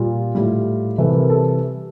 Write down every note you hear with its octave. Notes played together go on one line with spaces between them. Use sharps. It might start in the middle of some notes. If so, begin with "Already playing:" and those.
Already playing: A#2 G3 F4
A2 G3
C3 E3 G3 A4
A#4
A4